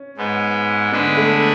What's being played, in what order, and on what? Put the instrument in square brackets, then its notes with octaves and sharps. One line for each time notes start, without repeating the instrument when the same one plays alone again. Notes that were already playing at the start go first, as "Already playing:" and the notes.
Already playing: [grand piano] C#4
[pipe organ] G#2 G#3 B3
[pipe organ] D3 G#3 D4 G#4 B4 [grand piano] B3
[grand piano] A3